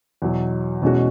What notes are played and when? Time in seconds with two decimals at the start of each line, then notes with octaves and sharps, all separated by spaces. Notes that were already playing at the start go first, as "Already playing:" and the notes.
0.22 E2 B2 F#3
0.82 E2 B2 G#3 C#4 F#4